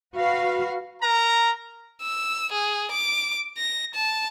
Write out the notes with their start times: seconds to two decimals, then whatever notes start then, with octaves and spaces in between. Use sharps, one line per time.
0.16 F#4 B4 F5
1.01 A#4 A#5
2.02 E6
2.52 G#4
2.91 D6
3.57 A#6
3.95 A5